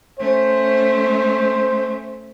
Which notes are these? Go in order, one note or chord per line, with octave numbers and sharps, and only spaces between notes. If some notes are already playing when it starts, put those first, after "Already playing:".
A3 C#4 C5